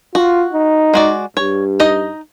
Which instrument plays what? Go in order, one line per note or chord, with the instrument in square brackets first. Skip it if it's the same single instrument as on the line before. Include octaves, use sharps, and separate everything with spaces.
[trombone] F4 [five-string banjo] F#4
[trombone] D#4
[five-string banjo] G#3 F#4 D5
[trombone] G2 [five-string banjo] C#5
[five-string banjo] D#4 D#5